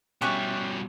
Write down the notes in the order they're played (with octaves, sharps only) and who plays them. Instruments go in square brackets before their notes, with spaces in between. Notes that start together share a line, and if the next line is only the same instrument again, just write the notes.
[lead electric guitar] B2 G3 [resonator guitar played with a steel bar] C#4 G4 [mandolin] E5 C#6 F#6